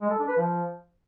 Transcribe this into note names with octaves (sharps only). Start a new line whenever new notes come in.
G#3
A4
D4
B4
F3